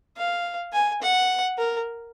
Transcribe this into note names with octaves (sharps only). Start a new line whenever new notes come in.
F5
G#5
F#5
A#4